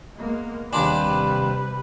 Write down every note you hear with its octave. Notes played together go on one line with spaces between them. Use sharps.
G#3 A#3 B3
D#2 C3 G3 D4 B4 G#5 C6